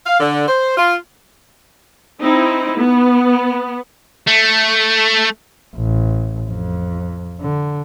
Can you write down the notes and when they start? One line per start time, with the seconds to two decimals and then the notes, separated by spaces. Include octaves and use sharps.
0.06 F5
0.20 D3
0.47 C5
0.77 F4
2.22 C4 D#4 E4
2.77 B3
4.28 A3
5.76 A1
6.49 F2
7.40 D3